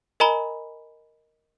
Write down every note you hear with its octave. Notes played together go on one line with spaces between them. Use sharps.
A#4 D#5 G#5 A#5 B5 G7